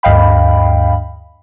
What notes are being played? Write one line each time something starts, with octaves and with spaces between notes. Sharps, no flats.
D2 G2 D#5 F5 G5 B5